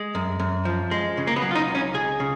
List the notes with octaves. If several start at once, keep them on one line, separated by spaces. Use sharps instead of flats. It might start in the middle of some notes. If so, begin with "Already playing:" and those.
Already playing: G#3
F#2
F#2
F3
G#3
C#3
A#3
B3
F#3
F4
D#4
C#2
C#4
C#2 G#4
C#3